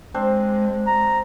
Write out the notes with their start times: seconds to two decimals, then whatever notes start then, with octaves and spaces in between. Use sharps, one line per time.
0.14 G#3 C4 D4 C5
0.87 A#5